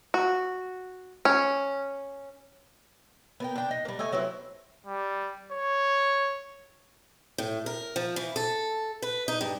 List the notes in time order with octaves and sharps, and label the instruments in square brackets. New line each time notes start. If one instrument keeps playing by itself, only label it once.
[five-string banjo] F#4
C#4
[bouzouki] B3 A#4 G5
D4 G5
D#4
G3 A#3
A3 D#5 G#5
F#3 B3 C4 E4
[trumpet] G3
C#5
[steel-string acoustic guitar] A2
A#4
F3
E3
A4
B4
D#4
G2